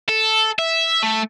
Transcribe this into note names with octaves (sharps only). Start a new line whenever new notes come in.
A4
E5
A3